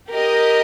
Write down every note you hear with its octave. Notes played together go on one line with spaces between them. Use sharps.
G4 A#4 D#5